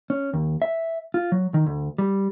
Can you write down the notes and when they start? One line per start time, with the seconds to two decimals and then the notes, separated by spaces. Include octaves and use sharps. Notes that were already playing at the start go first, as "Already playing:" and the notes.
0.10 C#4
0.34 D#2
0.62 E5
1.14 F4
1.32 F#3
1.54 D#3
1.66 D2
1.98 G3